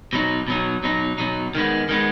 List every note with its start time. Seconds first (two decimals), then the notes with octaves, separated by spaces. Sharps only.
0.13 B2 F#3 D#4
0.48 B2 F#3 D#4
0.83 B2 F#3 D#4
1.18 B2 F#3 D#4
1.55 D#3 G#3 B3
1.89 D#3 G#3 B3